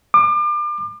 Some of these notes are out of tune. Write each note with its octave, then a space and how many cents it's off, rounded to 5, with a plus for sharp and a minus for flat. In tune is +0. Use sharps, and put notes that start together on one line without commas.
D6 +35